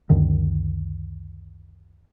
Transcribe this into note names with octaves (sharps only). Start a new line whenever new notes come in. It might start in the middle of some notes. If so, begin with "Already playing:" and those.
C#2 F#2 D3 D#3